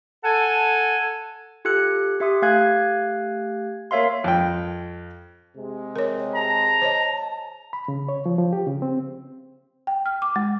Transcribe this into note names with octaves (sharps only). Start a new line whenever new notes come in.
A4 F#5 G#5 A5
F4 G4 A4 F#6 C#7
G4 E5 C6 D#6
A3 G4 F5 G#5 F#6 G#6
A#3 A#4 C#5 E5 F5 C6
F2 G5
C3 G#3
A#4 C#5
A5 A#5
C5 C#5 D#5
B5
C#3
C#5
F3
F3
G4
C#3
C4
G5
F6
D6
G#3